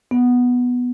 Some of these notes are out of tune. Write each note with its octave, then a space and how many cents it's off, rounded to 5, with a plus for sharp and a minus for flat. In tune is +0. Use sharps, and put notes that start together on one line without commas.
B3 +0